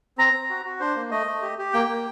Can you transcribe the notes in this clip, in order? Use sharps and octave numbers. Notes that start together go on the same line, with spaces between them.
C4 A#5
C4
F#4
F#4
D4 C5
A#3
A3 D#5
A3
G4
G4
A#3 G5
A#3